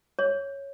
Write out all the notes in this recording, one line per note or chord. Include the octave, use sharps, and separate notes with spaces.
C#5